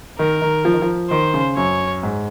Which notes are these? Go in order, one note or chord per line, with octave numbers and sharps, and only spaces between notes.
D#3 A#4
D#3
F3
D#3
F3
D#3 C5
C#3
F#2 C#5
G#2